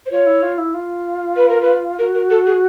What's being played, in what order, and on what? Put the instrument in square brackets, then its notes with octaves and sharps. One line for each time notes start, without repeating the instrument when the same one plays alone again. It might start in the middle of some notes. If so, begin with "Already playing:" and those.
[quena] C5
[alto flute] F4 [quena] C#5
[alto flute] E4
F4
E4
F4
[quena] B4
A#4
B4
[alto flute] F#4 [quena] A#4
[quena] A#4
A4
G#4